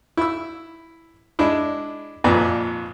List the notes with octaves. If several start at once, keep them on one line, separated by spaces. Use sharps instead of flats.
E4 E6
G#3 D4 E4
G#1 F2 A#2 B4 D5 A#5